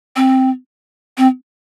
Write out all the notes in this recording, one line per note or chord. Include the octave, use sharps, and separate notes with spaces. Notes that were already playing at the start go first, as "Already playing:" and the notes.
C4
C4